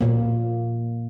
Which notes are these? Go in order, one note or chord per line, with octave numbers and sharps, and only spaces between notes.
A#2 A#3